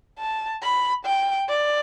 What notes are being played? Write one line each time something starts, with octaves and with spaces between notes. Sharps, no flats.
A5
B5
G5
D5